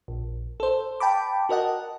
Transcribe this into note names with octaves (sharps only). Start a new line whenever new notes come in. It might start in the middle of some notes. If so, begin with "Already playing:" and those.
A#1
A4 C5
G5 A5 B5 D6
F#4 A#4 D#5 F#5 A5